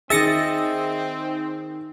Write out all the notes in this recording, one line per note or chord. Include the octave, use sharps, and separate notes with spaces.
D#3 C4 G#4 D#5 E5 A6 A#6 C#7